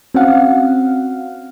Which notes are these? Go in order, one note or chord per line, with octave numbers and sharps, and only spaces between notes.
C4 C#4 F#4 F5 F#5